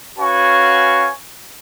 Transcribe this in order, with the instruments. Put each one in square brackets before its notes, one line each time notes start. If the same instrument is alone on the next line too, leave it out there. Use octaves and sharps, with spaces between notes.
[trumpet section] C#4 F#4 B4 F5 G#5 C#6